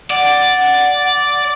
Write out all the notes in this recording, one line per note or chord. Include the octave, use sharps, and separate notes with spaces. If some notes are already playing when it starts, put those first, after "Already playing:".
D5 F#5